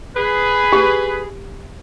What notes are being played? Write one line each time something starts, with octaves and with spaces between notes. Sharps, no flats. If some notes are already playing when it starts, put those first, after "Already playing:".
G#4 B4
G4